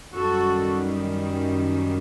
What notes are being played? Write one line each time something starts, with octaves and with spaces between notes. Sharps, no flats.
F#2 D#3 G3 F#4 A4